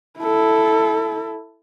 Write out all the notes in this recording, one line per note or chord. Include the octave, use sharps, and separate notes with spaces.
E4 A4